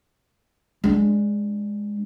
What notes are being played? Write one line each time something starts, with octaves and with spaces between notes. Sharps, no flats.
G#3 D4